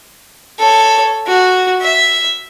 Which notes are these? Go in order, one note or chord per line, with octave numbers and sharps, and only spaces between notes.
A4 C#5
F#4
E5